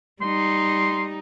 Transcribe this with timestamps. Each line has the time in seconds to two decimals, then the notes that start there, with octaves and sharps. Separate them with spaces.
0.21 G3 D#4 C6